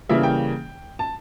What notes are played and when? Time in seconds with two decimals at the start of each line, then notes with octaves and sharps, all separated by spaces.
0.09 C#3 E3 G3 A#3 E5
0.23 G5
0.99 A5